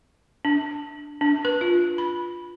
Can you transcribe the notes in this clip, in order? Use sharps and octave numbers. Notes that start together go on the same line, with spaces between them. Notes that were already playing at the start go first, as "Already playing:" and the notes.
D4
D4
B4
F4
B5